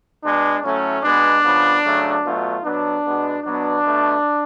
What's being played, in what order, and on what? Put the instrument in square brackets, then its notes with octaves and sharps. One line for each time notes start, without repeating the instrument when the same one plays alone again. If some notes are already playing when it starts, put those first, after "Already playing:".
[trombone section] B2 G#3 B3 D4
A2 F#3 A3 C#4
B2 G#3 B3 D4
C#3 F3 B3
C#3 F#3 A3
B2 F#3 A3 F4
B2 F#3 B3 D4
B2 G#3 B3
B2 F#3 B3 D4
B2 A3